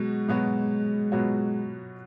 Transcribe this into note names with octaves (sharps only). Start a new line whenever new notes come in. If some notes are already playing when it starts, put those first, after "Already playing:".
Already playing: B2 F#3 G#3 B3 F#4
B2 F#3 B3 F#4 C#5
B2 F#3 B3 F#4 C#5